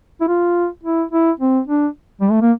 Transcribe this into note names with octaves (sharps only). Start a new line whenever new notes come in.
E4
F4
E4
E4
C4
D4
G3
A3
A#3